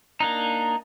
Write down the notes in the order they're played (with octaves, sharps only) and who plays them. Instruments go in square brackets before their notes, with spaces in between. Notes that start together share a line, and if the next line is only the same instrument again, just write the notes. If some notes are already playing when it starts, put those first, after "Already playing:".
[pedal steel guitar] A#3 D4 D#4 [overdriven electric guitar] A#5